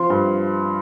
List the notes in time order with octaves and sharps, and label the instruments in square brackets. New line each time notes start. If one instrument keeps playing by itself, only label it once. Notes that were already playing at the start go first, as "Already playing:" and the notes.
Already playing: [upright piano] F3 C6
G2